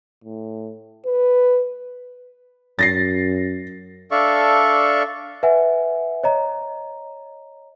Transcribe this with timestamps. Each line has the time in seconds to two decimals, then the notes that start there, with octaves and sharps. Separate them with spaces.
0.24 A2
1.06 B4
2.79 F#2 A6 A#6 C7
4.11 D4 A4 D5 E5 F5 C#6
5.43 B4 E5 F#5 G#5
6.23 C#5 D#5 A#5